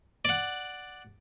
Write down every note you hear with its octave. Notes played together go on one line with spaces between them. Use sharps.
D5 F#5